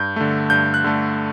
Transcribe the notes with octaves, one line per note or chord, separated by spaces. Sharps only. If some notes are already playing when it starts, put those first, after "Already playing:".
Already playing: G2 G6
D3 A3
G2 G6
F#6
D3 A3